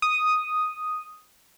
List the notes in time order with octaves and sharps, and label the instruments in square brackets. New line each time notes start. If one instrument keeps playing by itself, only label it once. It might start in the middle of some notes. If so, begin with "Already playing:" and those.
[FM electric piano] D#6